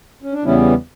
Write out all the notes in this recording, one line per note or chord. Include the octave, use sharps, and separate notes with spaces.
C#4
D4
E2 C#3 E3 G3 B3 C#4 E4